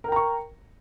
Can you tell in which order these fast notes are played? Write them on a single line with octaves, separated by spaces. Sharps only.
A#4 G5 A#5 C#6